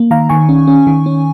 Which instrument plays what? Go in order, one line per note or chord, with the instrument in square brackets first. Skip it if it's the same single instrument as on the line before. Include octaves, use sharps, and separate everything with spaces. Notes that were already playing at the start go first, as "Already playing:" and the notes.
Already playing: [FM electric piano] A#3
D#3 F5 A#5
D#3 G#5 C#6
C#4
C#4
D#3
C#4